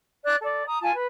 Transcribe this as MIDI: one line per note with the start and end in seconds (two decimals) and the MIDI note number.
0.23 0.35 74
0.23 0.35 90
0.40 0.63 69
0.40 0.63 74
0.65 0.77 82
0.65 0.77 87
0.81 0.89 65
0.81 0.89 80
0.81 0.89 81
0.93 1.05 71